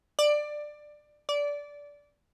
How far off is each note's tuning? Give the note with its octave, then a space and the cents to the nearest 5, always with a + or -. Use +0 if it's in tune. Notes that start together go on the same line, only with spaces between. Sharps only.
D5 +15
D5 -15